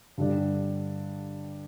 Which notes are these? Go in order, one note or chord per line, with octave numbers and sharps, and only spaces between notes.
G2 D3 G3 D4